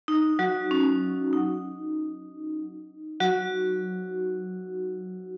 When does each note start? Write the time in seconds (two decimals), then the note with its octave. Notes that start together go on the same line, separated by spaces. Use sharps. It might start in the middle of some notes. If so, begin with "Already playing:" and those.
0.08 D#4
0.39 F#3 F#4
0.71 C#4
1.33 D#4
3.20 F#3 F#4